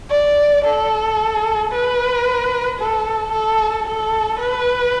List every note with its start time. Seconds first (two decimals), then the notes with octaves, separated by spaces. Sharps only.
0.10 D5
0.65 A4
1.72 B4
2.79 A4
3.32 A4
3.87 A4
4.40 B4